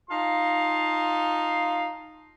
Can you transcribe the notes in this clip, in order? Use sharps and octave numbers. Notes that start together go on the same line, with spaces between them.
D#4 F4 F5 A5 C6